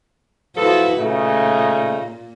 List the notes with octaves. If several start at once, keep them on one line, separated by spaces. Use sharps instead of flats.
F3 E4 F#4 A4 B4
A#2 C#3 A3 D#4